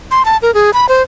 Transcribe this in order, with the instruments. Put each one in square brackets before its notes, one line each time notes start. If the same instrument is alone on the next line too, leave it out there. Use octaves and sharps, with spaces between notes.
[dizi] C6
A5
A#4
G#4
B5
C5